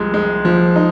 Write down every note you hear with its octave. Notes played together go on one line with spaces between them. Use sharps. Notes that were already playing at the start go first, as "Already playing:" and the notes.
Already playing: C2 F3 G#3
G#3
F3
D#4